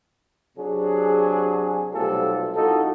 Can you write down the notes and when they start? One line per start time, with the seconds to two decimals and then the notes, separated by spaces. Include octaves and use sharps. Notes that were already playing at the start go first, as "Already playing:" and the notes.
0.57 C3 F#3 D4 G#4
1.94 B1 C3 G3 A3 F4 A4
2.55 C2 D#4 F4 F#4 A4